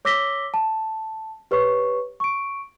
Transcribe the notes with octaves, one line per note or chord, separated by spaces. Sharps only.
C#5 D6 E6 A#6 B6 G7
A5
G4 B4 C#5 C#6
C#6 D7